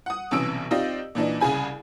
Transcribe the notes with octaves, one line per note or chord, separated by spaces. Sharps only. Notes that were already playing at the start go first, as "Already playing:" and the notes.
F#5 D#6
B1 C3 E3 C#4 E6 D7
C4 D#4 F4 G4 D5 D#5
A#2 E3 D4 D#4
C2 C#3 G#4 G#5 B5